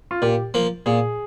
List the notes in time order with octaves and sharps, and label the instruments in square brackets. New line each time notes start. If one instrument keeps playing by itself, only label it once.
[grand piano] F4
[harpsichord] A#2 [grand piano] G4
[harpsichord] F3 A#3
[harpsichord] A#2 [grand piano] G#4